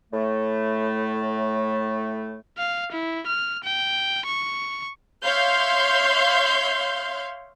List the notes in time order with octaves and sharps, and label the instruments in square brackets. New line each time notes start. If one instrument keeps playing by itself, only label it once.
[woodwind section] A2 A3
[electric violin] F5
E4
F6
G5
C#6
[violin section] C#5 E5 F5 C6 G6